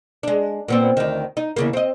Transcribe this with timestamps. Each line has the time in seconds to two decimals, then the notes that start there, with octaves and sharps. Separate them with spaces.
0.23 G#3 D4
0.68 A#2 B3 C4
0.97 D2 D#3
1.37 D#4
1.56 E2 C#3 A#3
1.73 C4 D#5